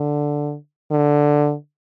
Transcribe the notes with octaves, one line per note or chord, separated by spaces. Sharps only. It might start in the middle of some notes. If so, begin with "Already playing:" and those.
Already playing: D3
D3